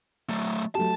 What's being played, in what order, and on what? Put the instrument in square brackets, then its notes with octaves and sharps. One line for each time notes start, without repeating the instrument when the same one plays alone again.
[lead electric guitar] F#3 A3
[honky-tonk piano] F#3 A3 G4 [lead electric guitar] A5